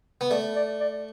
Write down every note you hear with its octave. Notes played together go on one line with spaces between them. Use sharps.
B3
A3 D5
D5
D5